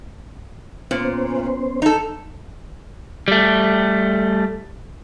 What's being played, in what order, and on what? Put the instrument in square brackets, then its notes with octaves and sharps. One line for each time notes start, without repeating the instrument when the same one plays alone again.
[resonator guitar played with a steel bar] A#2 [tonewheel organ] B3 C#4 C5
[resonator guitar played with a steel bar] D#4 A4
[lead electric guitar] G3 A3